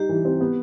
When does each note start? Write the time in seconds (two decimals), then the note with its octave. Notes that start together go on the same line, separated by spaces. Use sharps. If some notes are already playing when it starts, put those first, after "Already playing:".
Already playing: G3 D#4 G4
0.09 E3
0.25 C4
0.40 B3